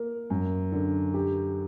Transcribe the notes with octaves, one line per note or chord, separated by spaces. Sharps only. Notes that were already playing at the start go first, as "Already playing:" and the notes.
Already playing: A#3 A#4
F#2
D3
G4